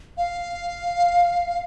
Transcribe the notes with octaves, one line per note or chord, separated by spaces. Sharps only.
F5